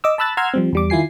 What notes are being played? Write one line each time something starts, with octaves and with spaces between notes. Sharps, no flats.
D#5 D6 E6
A5 B5 E6 F#6 A6
F#5 A#5 C6 E6 F6 G#6
F3 G3 C4
E2 G3 D6
D#3 E4 F4 G#5 C7